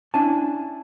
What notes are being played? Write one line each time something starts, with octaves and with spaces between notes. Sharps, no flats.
C#4 D4 E4 G#5 A5